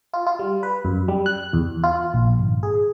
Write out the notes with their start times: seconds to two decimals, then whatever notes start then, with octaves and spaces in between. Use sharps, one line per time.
0.13 F4
0.27 F4
0.39 G3
0.63 B4
0.85 F#2
1.08 G3
1.26 F#6
1.53 E2
1.84 F4
2.14 A#1
2.39 G#1
2.63 G#4